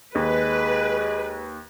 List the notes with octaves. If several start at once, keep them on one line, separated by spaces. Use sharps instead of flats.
D#2 G#3 B4